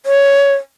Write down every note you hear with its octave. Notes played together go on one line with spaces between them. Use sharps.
C#5